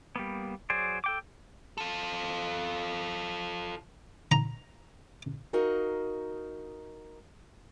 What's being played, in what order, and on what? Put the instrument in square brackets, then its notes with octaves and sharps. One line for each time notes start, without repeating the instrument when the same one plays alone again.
[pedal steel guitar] G3 A#3 B3
F#3 G#4 C5 D5
A4 G5 D6
[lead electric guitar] F4 A4
[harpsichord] A#5
[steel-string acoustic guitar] D#4 F#4 A#4 D#5 F5